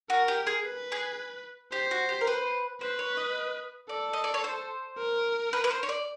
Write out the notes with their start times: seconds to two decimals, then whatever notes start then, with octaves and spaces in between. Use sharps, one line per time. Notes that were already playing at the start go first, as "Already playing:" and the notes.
0.10 F#4 A#4
0.28 G4
0.47 G#4
0.64 B4
0.92 G#4
1.72 G4 C5
1.91 F#4
2.09 G4
2.21 A#4
2.27 B4
2.81 B4 C5
2.99 C#5
3.17 D#5
3.89 A4 D5
4.13 D#5
4.24 D5
4.34 C#5
4.44 C5
4.98 A#4
5.53 B4
5.64 B4
5.71 C5
5.83 C#5
5.89 D5